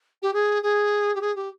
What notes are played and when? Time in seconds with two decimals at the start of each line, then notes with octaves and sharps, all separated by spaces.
0.22 G4
0.34 G#4
0.63 G#4
1.15 G4
1.21 G#4
1.36 G4